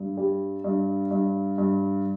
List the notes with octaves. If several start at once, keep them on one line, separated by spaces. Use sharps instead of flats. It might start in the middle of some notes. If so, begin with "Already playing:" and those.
Already playing: G2
G3
G2
G2
G2